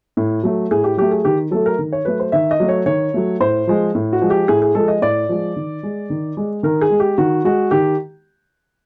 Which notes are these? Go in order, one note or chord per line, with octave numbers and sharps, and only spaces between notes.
A2
F#3 A3
A2 G#4
G4
F#3 A3 G4
G#4
D#3 G4
F#3 A3 A4
A#4
D#3
C#5
F#3 A3 B4
C5
D#3 E5
D#5
F#3 A3
C#5
D#3 C#5
F#3 A3
A2 C5
F3 G#3
A2
F#4
F3 G#3
G4
A2 G#4
G#4
F3 G#3 A4
D#5
A2 D5
F3 G#3
D#3
G#3
D#3
G#3
D#3 A#4
G#4
G#3
G4
D#3 F#4
G#3 F#4
D#3 G4